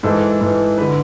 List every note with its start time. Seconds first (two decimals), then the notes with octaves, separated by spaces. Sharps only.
0.03 G#2 E3 A4
0.41 G#2 E3
0.78 B4
0.82 D3